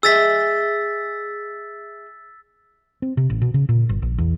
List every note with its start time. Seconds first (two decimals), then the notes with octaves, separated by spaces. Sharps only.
0.03 G#4 D#5 E5 E6 A6 B6
3.02 C4
3.17 C3
3.30 A1
3.42 B2
3.54 C#3
3.69 A#2
3.89 G1
4.02 A#1
4.18 E2